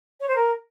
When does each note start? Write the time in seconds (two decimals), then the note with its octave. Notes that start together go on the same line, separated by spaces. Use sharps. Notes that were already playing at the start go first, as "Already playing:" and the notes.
0.20 C#5
0.28 C5
0.36 A#4